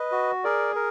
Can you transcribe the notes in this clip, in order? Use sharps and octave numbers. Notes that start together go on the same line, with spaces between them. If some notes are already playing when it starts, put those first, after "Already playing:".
Already playing: B4 D#5
F#4
G#4 A#4 D5
A#4